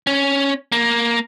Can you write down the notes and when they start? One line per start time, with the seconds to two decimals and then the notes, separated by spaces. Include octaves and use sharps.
0.07 C#4
0.72 A#3